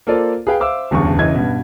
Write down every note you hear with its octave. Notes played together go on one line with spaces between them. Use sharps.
A#3 F4 A4 C5 D5
G#4 B4 F5 G5
C5 E5 F5 D6 E6
D1 E2 G2 C#3 C#6
F#1 E3 D#5 G#6
G2 B2